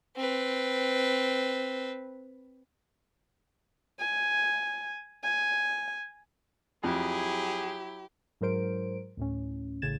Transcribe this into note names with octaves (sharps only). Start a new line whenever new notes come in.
C4 B4
G#5
G#5
F2 F#3 E4 G4 G#4
G#2 F#3 A#4 C5 D7
D2 A2 C#4
A1 A2 C#3 G#6 A6 E7